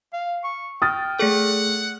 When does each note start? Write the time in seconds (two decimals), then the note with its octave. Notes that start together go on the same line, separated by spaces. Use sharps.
0.13 F5
0.44 C#6
0.82 G5 D#6 F6 A6
1.19 A3 G#4 A4 F#5